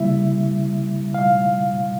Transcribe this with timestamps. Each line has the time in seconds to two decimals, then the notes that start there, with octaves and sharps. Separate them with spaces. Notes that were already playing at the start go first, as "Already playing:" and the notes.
Already playing: C#3 G3 A#3 E4 E5
1.14 F5